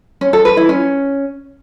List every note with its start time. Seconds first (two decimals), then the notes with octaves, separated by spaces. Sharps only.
0.21 C#4
0.33 A4
0.45 B4
0.57 E4
0.69 C#4